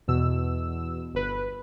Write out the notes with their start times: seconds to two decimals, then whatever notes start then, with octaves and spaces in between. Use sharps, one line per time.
0.08 E2 B2 E6
1.14 G1 B4